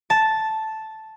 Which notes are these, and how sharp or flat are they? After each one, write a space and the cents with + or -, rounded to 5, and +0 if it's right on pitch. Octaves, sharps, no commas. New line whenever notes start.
A5 -5